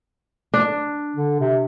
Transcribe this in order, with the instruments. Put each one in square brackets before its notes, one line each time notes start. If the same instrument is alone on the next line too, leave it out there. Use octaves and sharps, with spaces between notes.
[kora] D4
[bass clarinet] D3
C3